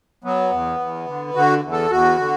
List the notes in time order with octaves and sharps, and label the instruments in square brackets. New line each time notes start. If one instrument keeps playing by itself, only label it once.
[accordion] F#3 B3
E2
E2
D3
D3 F#4
E2
A4
E2 F#4
D3